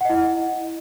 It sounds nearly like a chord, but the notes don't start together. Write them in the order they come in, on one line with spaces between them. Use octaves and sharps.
F#5 D#5 E4